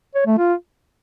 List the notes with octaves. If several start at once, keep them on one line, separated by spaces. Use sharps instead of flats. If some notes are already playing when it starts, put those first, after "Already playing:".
C#5
A3
F4